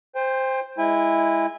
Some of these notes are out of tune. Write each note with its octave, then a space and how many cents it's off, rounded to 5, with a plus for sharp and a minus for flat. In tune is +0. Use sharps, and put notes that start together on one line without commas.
C5 +0 G5 +35
G#3 +0 E4 +0 G#5 -30